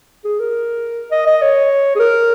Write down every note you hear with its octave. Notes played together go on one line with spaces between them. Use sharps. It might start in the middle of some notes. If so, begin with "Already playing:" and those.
G#4
A#4
D#5
D#5
C#5
G#4
A#4